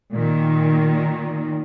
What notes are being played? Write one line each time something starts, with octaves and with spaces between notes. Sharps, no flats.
A#2 D#3